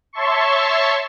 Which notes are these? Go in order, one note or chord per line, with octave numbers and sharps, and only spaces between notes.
C#5 E5 A5 C6 C#6